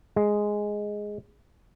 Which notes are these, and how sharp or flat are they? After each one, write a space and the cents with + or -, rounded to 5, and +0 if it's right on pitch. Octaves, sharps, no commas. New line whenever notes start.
G#3 +0